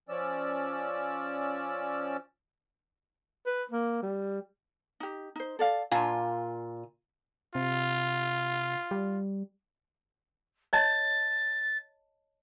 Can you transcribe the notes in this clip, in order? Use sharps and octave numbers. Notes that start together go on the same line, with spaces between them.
F3 C#4 D5 E6
B4
A#3
G3
D#4 G4
D#4 C5
A4 D5 F5
A#2 F4 G#5 A5
C3 F4
G3
C#5 D#5 A5 A6